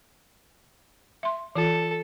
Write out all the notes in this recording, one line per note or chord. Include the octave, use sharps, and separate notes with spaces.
E5 C6
E3 F4 A4